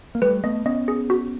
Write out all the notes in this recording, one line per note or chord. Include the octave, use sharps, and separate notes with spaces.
A#3
G3 A3 B4
A3 B3 D#5
B3 C#4 D#5
G#4
F#4